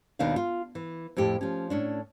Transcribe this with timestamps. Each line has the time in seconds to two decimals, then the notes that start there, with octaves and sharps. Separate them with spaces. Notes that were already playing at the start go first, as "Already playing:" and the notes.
0.19 D#2 B2 D#3 D4 F5
0.36 F4
0.75 E3
1.17 F2 A2 G4
1.41 F3 C#4
1.70 A2 C#4 D4